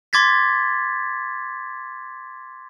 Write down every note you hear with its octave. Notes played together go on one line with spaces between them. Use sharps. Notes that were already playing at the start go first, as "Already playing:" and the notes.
C6 D6 G#6 A6 B6